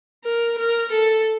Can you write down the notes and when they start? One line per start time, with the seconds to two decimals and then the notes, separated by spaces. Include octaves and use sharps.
0.24 A#4
0.58 A#4
0.91 A4